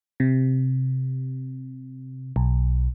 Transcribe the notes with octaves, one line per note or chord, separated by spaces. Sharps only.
C3
B1